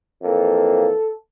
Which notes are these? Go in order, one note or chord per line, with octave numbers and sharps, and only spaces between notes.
F2 E3 A#3 A4